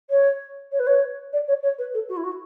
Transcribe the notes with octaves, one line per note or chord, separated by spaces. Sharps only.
C#5
C#5
B4
C#5
D5
C#5
C#5
B4
A4
F#4
E4
F#4